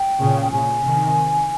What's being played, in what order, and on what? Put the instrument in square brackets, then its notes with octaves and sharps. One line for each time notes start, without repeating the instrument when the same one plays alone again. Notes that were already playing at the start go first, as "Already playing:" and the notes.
Already playing: [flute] G5
[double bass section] A#2 C#3
[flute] G5
[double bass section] A#2 C#3 [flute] G#5
[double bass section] C3 D#3